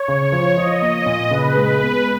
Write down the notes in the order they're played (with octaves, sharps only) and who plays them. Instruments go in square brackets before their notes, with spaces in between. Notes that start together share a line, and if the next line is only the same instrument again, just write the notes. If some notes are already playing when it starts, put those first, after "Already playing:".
Already playing: [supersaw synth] C#5
[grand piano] C#3
F3
[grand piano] F3 [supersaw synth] D#5
[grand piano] A#3
A#2
[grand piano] C#3 [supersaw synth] B4
[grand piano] G#3
B3